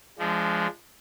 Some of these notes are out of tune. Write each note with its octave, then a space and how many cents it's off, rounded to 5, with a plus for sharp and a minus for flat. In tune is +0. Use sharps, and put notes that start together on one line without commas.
F3 -25 G#3 +0 D4 -15